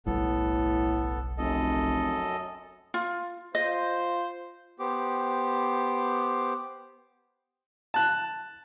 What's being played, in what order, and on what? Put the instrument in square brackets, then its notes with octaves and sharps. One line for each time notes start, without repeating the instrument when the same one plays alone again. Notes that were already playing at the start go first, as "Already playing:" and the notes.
[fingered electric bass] F#1 B1 G3 [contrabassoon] A2 [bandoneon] B3 A4
[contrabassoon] F1 [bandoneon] F#2 A4 D#5
[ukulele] F4
[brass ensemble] F4 C5 [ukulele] D#5
[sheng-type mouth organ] B3 G4 C5 D6
[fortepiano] A5 F#6